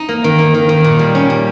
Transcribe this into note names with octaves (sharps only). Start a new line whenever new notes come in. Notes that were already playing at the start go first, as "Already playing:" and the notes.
Already playing: D#4
A#3
D#3
A#3
D#3
D#3
A#2
G3
C#4
G3